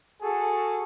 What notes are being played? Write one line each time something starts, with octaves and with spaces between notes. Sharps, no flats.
F#4 G#4 A4